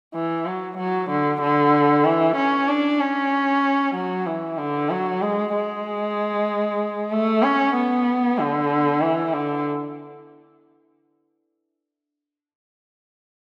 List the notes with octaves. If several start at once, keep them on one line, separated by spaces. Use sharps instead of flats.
E3
F#3
F#3
D3
D3
E3
C#4
D4
C#4
F#3
E3
D3
F#3
G#3
G#3
A3
C#4
B3
D3
E3
D3